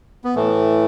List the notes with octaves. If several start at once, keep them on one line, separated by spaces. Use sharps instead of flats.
B3
A2 E3 A3